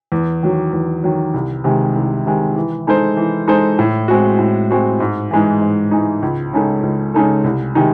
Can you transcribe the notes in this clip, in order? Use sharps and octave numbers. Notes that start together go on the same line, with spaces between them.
E2
D#3 F#3
E2
D#3 F#3
C2
C3 D#3 G#3
C2
C3 D#3 G#3
E3
G#3 D#4 A4 C5
E3
G#3 D#4 A4 C5
A2
G#3 C4 F#4
A2
G#3 C4 F#4
G#2
E3 G#3 D#4
G#2
E3 G#3 D#4
C#2
C#3 G#3 D#4 A4
C#2
C#3 G#3 D#4 A4
C2
C3 D#3 G#3 D#4